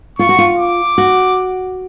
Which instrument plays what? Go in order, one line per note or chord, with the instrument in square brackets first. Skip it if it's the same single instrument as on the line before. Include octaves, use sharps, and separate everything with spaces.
[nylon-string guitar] F4 [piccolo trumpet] C#6
[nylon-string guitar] F#4
F4
[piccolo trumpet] D6
[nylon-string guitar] F#4